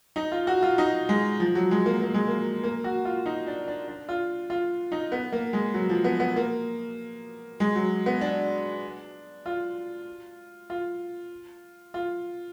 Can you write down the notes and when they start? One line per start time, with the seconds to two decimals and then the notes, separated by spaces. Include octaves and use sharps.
0.16 D#4
0.32 F4
0.47 F#4
0.62 F4
0.78 D#4
1.09 G#3
1.40 F3
1.55 F#3
1.71 G#3
1.86 A#3
2.02 A#3
2.14 G#3
2.28 A#3
2.64 A#3
2.84 F#4
3.05 F4
3.26 D#4
3.47 D4
3.67 D4
3.88 D4
4.09 F4
4.50 F4
4.92 D#4
5.12 B3
5.32 A#3
5.53 G#3
5.74 F#3
5.89 F3
6.04 B3
6.20 B3
6.36 A#3
7.60 G#3
7.75 F#3
8.06 B3
8.21 D4
9.46 F4
10.70 F4
11.94 F4